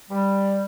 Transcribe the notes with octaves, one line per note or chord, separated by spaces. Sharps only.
G3